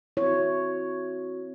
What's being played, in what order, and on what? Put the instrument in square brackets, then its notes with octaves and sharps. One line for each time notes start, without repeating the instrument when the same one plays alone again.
[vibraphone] C4 F#4 [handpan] E4 C#5